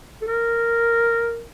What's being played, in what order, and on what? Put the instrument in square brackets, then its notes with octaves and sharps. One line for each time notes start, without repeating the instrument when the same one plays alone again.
[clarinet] A4
A#4